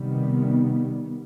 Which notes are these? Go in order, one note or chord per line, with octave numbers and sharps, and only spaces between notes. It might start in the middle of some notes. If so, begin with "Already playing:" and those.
Already playing: C3 D#3 G3 B3